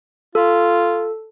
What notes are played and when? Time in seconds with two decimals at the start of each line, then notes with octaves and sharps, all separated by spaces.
0.35 F4 A4